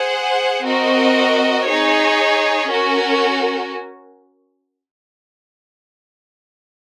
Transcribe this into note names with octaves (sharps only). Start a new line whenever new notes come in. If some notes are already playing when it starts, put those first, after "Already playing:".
Already playing: G#4 C5 F#5
C4 F#4 A#4 D#5
D#4 G#4 C#5
C#4 F#4 A#4